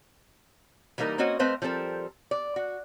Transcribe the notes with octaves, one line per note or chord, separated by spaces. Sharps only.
E3 G3 A#3 D#4 A#4 D#5
A#3 C4 C#4 F#4 D#5
A3 C4 B4 C5 D#5 F5
F3 G3 C4 A4 A#4
D5
F#4